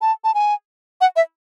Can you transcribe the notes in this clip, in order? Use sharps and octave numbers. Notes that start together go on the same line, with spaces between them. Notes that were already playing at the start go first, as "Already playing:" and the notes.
A5
A5
G#5
F#5
E5